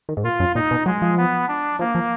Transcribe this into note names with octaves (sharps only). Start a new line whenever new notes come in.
D#3
G#2
A#2 F4
F#2
A#2 D#4
B2
F#3 G#3
F3
B3
D4
F3 A#3
F3